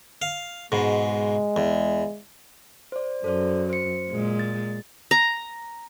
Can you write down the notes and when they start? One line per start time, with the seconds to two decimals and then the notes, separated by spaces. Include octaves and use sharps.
0.22 F5
0.72 G#2 B2 G#3
1.56 E2
2.92 C5 D5
3.24 F#2 A4 C5 D5
3.69 C5 C#7
4.09 A#2 G#3
4.39 A6
5.11 A#5